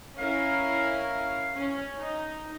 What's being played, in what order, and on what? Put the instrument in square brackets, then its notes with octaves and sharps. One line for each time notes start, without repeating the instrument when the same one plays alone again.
[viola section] C#4 E4 A#4 [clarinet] F5
[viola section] C#4
D#4